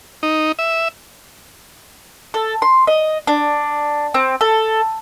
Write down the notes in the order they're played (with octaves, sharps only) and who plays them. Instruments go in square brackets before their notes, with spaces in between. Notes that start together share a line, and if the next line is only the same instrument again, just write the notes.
[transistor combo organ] D#4
E5
[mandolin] A4
C6
D#5
D4
C4
A4